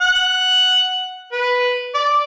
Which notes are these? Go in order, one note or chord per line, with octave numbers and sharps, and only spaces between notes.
F#5
B4
D5